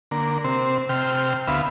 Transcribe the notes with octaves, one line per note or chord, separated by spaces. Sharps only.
D3 A#3
C3 C4
C3 G5 F6
D2 B3 E5 F5